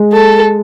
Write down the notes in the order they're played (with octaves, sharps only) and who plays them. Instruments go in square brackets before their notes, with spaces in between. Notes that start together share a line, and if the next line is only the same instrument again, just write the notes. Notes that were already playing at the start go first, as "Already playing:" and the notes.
Already playing: [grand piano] G#3
[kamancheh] A4